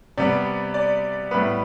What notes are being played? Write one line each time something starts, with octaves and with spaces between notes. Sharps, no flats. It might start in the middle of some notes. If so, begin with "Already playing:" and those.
C3 G3 B3 D5
D5
A2 G3 B3 B4